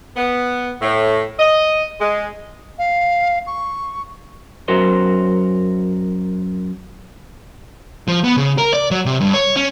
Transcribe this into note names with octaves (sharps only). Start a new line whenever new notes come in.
B3
A2
D#5
G#3
F5
C#6
F#2 F#4 A#4 C5
F3
B3
C#3
A#4
D5
F#3
C3
G2
C#5
C#4